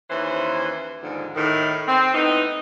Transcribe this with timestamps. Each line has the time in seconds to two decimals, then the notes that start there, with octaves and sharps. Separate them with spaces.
0.10 D#2 E3 C#4 C5
1.02 D#2 G#2 D3 F3
1.35 A2 D#3
1.87 C4
2.14 A2 B3 D#4